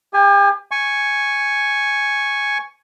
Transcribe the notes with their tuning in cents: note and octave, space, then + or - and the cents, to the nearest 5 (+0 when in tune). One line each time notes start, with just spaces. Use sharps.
G4 +40 G#5 +0
G#5 +0 C#6 +0